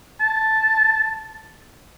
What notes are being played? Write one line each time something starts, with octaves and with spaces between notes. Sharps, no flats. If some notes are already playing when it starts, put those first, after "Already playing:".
A5